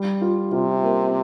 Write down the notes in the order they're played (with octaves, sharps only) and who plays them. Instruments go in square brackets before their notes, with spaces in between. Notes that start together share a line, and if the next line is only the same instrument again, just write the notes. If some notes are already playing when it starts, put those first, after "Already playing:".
Already playing: [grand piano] G3
F4
[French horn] C3 [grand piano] F4
[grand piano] A#3